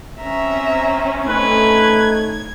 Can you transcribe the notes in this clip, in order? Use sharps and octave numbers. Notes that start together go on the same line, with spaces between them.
C4 C#4 E5 A#5
A3 D#4 B4 G#6